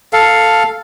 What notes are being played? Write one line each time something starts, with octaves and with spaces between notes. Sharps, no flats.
A4 F5